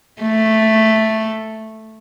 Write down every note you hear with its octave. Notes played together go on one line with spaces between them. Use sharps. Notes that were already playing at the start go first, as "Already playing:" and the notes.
A3